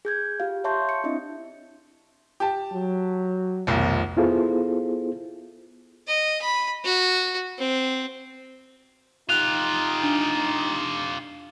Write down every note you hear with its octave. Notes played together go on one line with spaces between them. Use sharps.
G#4 G6 G#6
F4 G4 F5
C#5 E5 A5 C6 C#6 G6
C#7
C4 D4 E4 D#5 E5
G4 A5
F#3
F1 B1 D#3
B3 E4 F4 G#4 A4 C5
D#5
B5
F#4
C4
D#4 F4 G4 F#6 F7
D4